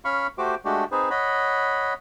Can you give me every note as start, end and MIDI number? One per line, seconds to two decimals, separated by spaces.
0.05 0.27 61
0.05 0.27 77
0.05 0.27 83
0.05 0.27 85
0.38 0.55 57
0.38 0.55 66
0.38 0.55 67
0.38 0.55 72
0.38 0.55 86
0.65 0.84 56
0.65 0.84 57
0.65 0.84 62
0.65 0.84 66
0.65 0.84 67
0.92 1.09 60
0.92 1.09 63
0.92 1.09 68
0.92 1.09 71
0.92 1.09 72
1.10 1.94 73
1.10 1.94 75
1.10 1.94 78
1.10 1.94 83